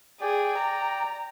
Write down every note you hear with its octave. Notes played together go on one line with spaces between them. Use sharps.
G#4 D5 G5
A#5